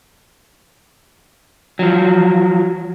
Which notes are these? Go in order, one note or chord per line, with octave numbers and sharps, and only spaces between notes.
F3 F#3